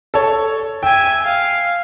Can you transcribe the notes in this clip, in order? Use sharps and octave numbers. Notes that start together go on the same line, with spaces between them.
A4 C#5
E5 G5 G#5
F5